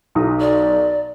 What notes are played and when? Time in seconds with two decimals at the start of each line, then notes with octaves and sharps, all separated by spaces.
0.15 B1 D#4 D#6
0.41 D5